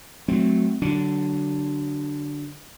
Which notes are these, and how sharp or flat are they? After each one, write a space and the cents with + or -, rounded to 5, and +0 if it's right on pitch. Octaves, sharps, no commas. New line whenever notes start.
F#3 +0 A3 -15 C4 +0
D3 +0 F#3 +30 D4 +0